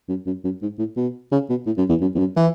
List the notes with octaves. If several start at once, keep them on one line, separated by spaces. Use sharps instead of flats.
F#2
F#2
F#2
G#2
A2
B2
C#3
B2
A2
F#2
E2
F#2
E2
F#2
E3